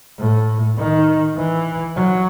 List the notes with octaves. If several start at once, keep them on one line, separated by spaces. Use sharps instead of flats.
A2
D#3
E3
F#3